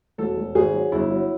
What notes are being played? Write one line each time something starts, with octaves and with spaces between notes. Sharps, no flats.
E1 A4
E1
G#1 G#4
F#3
G1 E4
F#3